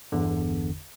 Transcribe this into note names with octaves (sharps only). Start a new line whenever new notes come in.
G1 E2 D3